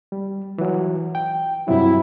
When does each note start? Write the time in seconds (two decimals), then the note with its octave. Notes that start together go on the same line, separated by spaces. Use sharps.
0.12 G3
0.58 E3 F#3
1.15 G5
1.68 G2 C3 F#3 E4